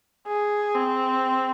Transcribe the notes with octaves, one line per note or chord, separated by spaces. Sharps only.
G#4
C4